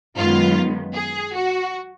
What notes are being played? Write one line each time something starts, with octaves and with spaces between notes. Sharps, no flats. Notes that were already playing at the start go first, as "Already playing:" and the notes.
F#2 D#3 G#3 B3 F4
G#4
F#4